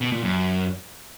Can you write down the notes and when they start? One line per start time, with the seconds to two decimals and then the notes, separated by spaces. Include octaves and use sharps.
0.01 B2
0.12 A#2
0.23 F#2